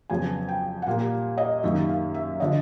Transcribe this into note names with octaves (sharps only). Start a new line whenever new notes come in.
F2 C#3 F#3 B3 G#5
G5
F#5
A#2 G3 A#3 F5
D#5
F#2 D#3 G3 A#3 E5
F5
E5
D3 F3 D#5